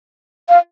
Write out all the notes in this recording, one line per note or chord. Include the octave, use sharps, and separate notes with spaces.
F5